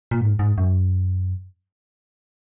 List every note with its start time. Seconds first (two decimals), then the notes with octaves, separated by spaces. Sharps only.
0.11 A#2
0.21 G#2
0.39 G#2
0.58 F#2